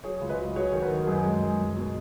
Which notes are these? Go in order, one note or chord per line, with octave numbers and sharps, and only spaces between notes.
F#3 G#4 C#5
C#2
B4 D#5
F#3
F#3 G#4 C#5
D#3
F#4 B4
D#3
F#2 D#4 G#4
G#3
F#2
B2
B2